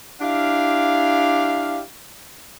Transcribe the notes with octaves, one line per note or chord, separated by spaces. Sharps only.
D4 E4 G4 F5